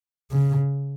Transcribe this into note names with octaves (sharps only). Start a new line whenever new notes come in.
C#3